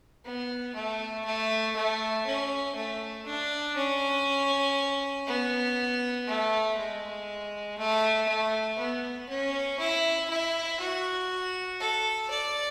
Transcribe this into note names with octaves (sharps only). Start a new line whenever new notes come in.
B3
A3
A3
A3
C#4
A3
D4
C#4
B3
A3
G#3
A3
A3
B3
C#4
E4
E4
F#4
A4
D5